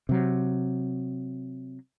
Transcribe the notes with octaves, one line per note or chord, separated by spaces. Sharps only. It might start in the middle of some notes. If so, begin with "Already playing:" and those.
C3 F#3